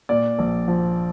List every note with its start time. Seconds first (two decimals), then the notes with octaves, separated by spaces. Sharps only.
0.09 A#2 D5
0.39 A#1
0.68 F3